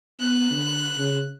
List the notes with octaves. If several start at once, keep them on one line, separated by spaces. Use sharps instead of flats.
B3 F#6
D3
C#3